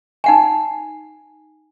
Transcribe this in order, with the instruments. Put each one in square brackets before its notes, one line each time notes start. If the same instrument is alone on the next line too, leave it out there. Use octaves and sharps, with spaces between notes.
[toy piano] D#4 F#5 G#5